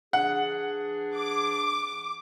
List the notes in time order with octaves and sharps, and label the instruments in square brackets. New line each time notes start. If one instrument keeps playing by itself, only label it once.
[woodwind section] E3 D4 G#4 [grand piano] F#5
[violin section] D6